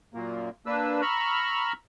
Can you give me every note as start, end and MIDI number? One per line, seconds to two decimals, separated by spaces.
0.14 0.49 42
0.14 0.49 46
0.14 0.49 58
0.66 1.01 58
0.66 1.01 62
0.66 1.01 71
0.66 1.01 88
1.02 1.73 82
1.02 1.73 83
1.02 1.73 85
1.02 1.73 88
1.02 1.73 89